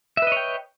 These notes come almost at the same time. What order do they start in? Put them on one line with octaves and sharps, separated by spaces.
E5 B4 D#5 C#5 G5